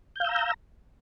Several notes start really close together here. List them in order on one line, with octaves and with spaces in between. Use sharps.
G6 F5 E6 A#5